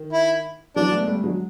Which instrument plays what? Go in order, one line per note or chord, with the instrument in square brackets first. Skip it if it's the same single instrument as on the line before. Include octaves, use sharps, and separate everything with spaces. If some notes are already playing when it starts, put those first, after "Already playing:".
Already playing: [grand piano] D#3
[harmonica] E4
[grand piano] E3 F#3 [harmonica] D4
[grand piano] A3 B3
G#3
G3 A3
F#3 G#3